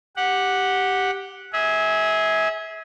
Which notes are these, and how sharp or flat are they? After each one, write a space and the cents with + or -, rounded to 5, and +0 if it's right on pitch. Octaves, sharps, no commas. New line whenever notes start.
G4 +0 F#5 -5
G#4 +5 E5 -30